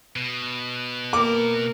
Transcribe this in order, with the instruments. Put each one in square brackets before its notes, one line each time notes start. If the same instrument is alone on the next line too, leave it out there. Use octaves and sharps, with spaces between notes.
[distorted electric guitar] B2
[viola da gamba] A#3 A#4 [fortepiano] D6